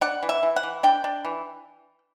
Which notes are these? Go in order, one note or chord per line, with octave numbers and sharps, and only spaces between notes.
D4 F#5
E3
E5
E3
F#5
E3
D4 G5
D4
E3